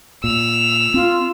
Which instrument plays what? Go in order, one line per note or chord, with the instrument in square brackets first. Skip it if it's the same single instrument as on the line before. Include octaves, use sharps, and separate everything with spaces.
[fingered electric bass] A#2 [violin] E6 F7
[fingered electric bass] C4 [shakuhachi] F4